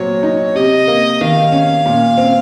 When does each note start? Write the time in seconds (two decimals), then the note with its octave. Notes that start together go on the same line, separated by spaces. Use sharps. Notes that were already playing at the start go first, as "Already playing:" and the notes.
Already playing: A#2 F#3 C4 C#5
0.23 D#4
0.55 C3 D#5
0.88 A#3
1.21 D#3 F5
1.52 C#4
1.86 A#2
2.17 C4